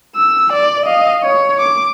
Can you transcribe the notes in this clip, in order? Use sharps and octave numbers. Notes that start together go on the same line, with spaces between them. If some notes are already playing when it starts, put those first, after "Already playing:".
E6
D5
D#5 F5
C#5
D6